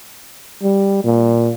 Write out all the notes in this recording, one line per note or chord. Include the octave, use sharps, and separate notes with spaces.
G3
A#2